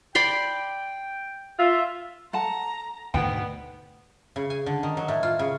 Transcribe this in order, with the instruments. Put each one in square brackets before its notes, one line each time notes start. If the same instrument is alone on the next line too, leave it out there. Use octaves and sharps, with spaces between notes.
[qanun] D5 B5 C6 [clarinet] G5
[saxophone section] F4 [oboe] E5
[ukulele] A4 F#5 A5 [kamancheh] A#5
[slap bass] D2 G#2 B2 [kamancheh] B3 [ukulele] G5
[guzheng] C#3
G#5
D3
D#3
F#3
A2
F4
C#3